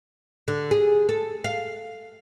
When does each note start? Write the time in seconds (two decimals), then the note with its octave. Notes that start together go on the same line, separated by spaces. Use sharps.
0.48 D3
0.71 G#4
1.09 A4
1.44 F5